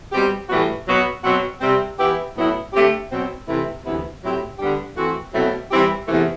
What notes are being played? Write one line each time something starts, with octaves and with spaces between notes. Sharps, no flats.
B2 G3 C4 G4
A2 E3 G3 B3 F#4
B2 F#3 B3 F#4
B2 F#3 C4 F#4
C3 G3 C4
E3 B3 E4 G4
A2 F#3 B3 E4
D3 A3 C4 G4
B2 F#3 C4
C3 E3 A3 E4
D2 C3 E3 B3 E4
A2 F#3 C4 E4 G4
D3 G3 B3 D4 G4
E3 A3 C4 F#4
B2 F#3 A3 C4 E4
E3 G3 C4 E4 G4
E2 C3 E3 A3